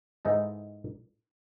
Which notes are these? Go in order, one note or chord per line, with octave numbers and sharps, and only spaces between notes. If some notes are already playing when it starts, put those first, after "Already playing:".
G#2 E3 G#3 D#4 A4